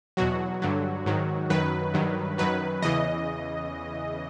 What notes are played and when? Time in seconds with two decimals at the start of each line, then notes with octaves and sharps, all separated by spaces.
0.17 E2 B2 F#3 F#4
0.62 G2 D3 F#3
1.06 G#2 D#3 F#3
1.50 F#2 D#3 F#3 B4
1.94 G2 D#3 F#3
2.38 F#2 D#3 F#3 B4
2.82 E2 C#3 E3 D#5